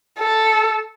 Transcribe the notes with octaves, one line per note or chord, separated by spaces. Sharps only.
A4